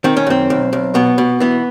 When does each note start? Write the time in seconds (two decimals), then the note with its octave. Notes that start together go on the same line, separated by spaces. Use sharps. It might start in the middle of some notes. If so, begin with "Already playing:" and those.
0.04 D#3 C4
0.17 C#4
0.27 F#2 C4
0.50 B1
0.73 B1
0.95 B2 B3
1.18 B2
1.40 E3 B3